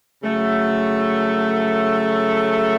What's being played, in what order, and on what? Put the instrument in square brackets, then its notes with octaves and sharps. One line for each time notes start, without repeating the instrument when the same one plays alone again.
[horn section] C#3 F#3 A3